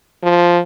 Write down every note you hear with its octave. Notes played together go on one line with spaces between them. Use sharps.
F3